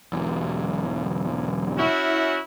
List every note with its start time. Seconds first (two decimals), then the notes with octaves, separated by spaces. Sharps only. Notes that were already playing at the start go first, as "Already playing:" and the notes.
0.13 B1 E2
1.78 C#4 E4 F#4